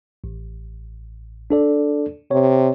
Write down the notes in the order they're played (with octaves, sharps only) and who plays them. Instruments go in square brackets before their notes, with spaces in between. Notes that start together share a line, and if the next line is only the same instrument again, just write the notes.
[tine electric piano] A1
D4 A4 D5
[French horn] C3 [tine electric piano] C#5